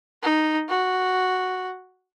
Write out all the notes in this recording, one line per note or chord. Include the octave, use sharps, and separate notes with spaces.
D#4
F#4